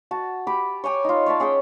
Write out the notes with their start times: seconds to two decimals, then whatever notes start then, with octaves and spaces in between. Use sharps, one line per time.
0.11 F#4 A5
0.47 G4 B5 D6
0.84 C#5 G5 G#5 D6
1.04 D#4 F4
1.26 C#5 D5 E5 A5
1.40 C#4 G#4 F#5 G5